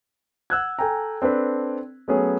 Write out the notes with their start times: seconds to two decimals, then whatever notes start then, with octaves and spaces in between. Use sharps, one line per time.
0.50 F#5 E6 F#6 G#6
0.79 A4 G5 G#5 A#5
1.22 C4 D4 A4 B4
2.08 F#3 A3 B3 C#4 G#4